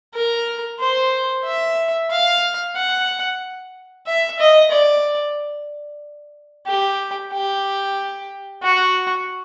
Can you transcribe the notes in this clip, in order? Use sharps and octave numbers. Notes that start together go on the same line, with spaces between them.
A#4
C5
E5
F5
F#5
E5
D#5
D5
G4
G4
F#4